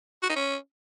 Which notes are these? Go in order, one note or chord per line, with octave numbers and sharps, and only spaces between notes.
F#4
D#4
C#4